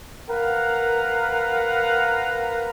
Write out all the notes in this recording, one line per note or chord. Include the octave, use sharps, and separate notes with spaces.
A#4 B4 F5 F#5 A#5